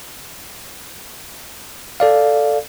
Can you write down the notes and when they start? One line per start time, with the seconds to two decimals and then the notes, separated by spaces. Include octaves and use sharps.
2.00 A4 D5 F5